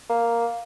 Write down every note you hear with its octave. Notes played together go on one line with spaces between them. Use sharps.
A#3